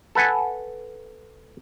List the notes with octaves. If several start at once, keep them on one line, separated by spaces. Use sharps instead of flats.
A4 B4 F#5 G#5